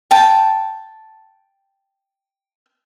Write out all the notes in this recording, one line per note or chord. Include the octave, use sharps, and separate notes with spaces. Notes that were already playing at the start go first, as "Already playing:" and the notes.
G5 A5